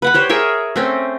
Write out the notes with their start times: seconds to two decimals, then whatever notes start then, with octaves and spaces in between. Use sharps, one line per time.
0.02 B4 F#5 B5
0.14 G4 C5 C#5
0.29 G#4 A#4 C#5 E5
0.76 A3 C4 C#4